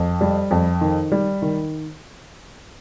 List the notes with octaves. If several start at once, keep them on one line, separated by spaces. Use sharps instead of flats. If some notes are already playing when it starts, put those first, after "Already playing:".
Already playing: F2
G3
F2
D#3
G3
D#3